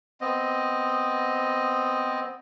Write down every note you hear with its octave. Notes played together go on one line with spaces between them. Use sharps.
B3 C4 D#5